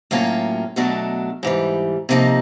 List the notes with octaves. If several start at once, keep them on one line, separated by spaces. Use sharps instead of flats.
A2 F#3 A#3 C#4 F4
B2 F#3 A3 D4
G#2 E3 G3
C3 F3 A#3 D#4